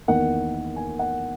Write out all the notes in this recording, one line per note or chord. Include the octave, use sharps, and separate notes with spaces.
E2 D#3 A#3 F#5
G#5
F#5